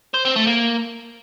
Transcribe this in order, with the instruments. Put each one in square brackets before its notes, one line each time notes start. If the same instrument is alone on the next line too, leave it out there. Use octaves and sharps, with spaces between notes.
[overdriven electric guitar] C5
C4
A3
A#3